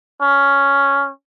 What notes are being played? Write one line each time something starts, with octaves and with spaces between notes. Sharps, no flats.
C#4